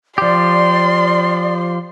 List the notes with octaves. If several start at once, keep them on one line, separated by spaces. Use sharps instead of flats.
F3 G4 D5 C6